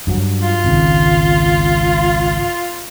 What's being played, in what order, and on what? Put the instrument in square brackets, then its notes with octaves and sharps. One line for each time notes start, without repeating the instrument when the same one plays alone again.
[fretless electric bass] G2 F#3
[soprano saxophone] F4
[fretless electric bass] G#1 C#2